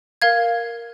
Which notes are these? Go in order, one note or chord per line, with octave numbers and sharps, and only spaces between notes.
A#4 F5 G#6